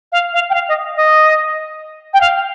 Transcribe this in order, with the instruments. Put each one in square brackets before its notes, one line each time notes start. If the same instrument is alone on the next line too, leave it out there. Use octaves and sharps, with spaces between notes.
[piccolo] F5
F5
G5
F5
D#5
D#5
G5
F5